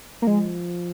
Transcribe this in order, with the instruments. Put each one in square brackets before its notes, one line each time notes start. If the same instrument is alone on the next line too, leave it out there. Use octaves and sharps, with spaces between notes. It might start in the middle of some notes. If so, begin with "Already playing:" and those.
[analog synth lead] A#3
[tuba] F3 [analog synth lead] G#3